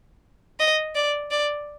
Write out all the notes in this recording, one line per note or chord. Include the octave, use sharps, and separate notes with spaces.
D#5
D5
D5